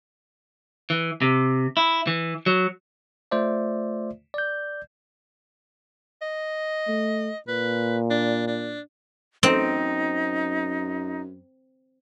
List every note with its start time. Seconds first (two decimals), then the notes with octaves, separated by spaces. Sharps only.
0.90 E3
1.22 C3
1.77 E4
2.07 E3
2.46 F#3
3.31 A3 F4 C5 D5 E5
4.34 D5 G6
6.22 D#5
6.88 A3
7.48 A#2 B4
8.11 D4
8.47 D4
9.43 F#2 C4 D#4